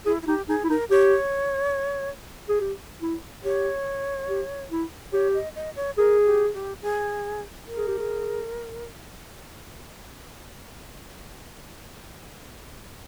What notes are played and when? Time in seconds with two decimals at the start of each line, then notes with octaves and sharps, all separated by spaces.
0.06 E4 G#4
0.22 E4
0.27 D#4 G4
0.48 D#4 G#4
0.64 E4
0.69 D#4 A#4
0.91 G4 C#5
2.48 G#4
2.60 G4
3.02 E4
3.44 G4 C#5
4.29 G4
4.71 E4
5.13 G4 C#5
5.34 D#5
5.55 D#5
5.76 C#5
5.98 G#4 A#4
6.25 G4
6.53 G4
6.82 G#4
7.67 A#4
7.77 G#4
7.87 G4
7.99 G#4